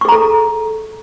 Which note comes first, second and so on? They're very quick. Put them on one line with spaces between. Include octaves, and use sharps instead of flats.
C#6 G#4 A#5 A4